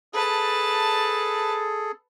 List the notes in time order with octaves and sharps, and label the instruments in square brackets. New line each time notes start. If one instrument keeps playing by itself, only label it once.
[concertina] G#4 A4 [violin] B4 A5